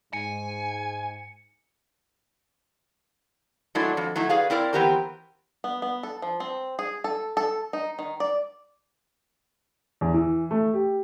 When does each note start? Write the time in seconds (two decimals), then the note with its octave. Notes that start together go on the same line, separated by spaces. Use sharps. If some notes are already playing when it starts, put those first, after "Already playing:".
0.13 G#2 G#5 C#7
3.75 F#3 G#3 A3 D4 E4
3.97 F2
4.16 F#3 A3 D#4 E4
4.29 G#4 B4 D5 F5
4.50 C4 E4 A#4 D5
4.73 E3 B3 C4 G4 A#4 C5
5.64 B3
5.82 B3
6.03 A4
6.22 F3
6.40 C4
6.79 G#4
7.04 A4
7.37 A4
7.73 D#4
7.99 D#3
8.20 D5
10.01 E2
10.14 E3
10.51 A3
10.74 G4